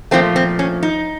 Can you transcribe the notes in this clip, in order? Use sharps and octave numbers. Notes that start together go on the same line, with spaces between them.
A#2 F3 A3 C4
C4
C#4
D#4